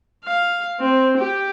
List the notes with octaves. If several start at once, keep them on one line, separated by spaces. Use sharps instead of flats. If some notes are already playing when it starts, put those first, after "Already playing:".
F5
C4
G4